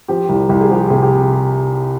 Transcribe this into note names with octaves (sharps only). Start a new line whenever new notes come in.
F3 G4
C2
C2 G4
G#4
F3 G4
C3 G#4
G4